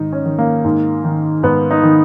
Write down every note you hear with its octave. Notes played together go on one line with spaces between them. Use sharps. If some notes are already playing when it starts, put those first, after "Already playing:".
Already playing: G#2 D#3 D#4
C#4
D#3
A#3
G#2
D#3
G#2 B3
D#4
D#3